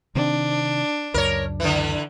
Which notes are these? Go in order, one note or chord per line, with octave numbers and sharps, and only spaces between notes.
C3 D#3 C4 D4
C#2 F#2 A#4 C#5
D3 E3